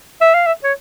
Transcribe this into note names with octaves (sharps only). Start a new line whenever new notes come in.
E5
F5
E5
C#5